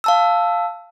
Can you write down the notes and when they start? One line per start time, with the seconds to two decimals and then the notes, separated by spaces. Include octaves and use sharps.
0.04 F5 A5 E6